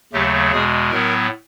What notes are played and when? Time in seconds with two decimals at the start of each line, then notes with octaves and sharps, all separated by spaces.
0.13 D#2 C#3 F#3 A3 G4
0.51 E2 B2 G#3 G#4
0.91 A2 F#3 B3 A#4